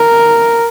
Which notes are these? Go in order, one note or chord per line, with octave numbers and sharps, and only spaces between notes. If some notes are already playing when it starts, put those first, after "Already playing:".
Already playing: A#4